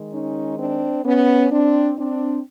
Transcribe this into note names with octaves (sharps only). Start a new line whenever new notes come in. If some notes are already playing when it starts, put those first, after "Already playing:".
Already playing: D#3 G#3
C#4 D#4
C4 D4
B3 C#4
C4 D4
C4 D4